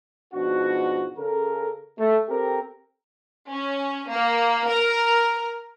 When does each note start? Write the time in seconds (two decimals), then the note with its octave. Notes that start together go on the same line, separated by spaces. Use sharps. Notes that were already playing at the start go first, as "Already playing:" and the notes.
0.34 G#2 B2 F3 D4 F#4
1.18 C#3 A4 A#4
1.99 A3
2.29 C4 G4 A4 A#4
3.52 C#4
4.11 A#3
4.68 A#4